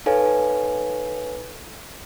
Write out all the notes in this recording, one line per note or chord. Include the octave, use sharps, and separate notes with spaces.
D#4 A4 B4 C#5 F5 G#5